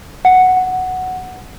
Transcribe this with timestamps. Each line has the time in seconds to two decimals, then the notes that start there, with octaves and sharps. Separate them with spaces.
0.25 F#5